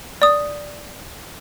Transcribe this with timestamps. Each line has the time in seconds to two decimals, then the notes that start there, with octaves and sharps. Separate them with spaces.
0.22 D5 D#6